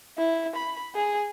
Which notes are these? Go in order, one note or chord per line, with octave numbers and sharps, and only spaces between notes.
E4
B5
G#4